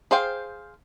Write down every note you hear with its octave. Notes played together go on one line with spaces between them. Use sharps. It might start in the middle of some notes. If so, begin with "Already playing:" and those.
G#4 C5 F5 G5